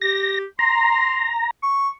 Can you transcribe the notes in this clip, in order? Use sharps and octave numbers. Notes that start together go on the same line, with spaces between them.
G4 A#6
A#5 C6
C#6